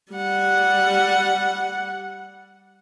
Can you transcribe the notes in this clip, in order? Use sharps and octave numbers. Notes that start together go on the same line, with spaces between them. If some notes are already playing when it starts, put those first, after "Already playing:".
G3 F#5